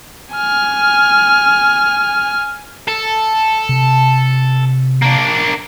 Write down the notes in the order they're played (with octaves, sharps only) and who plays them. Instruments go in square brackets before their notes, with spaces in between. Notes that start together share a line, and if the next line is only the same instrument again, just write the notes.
[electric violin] G#5 F6
[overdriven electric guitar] A4
[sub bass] C3
[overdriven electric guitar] A#3 D4